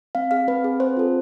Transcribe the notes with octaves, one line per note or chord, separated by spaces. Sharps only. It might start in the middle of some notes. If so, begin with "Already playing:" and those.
C4 F5
G#4 F5
C4 B4
G#4
C4 C5
F4 A4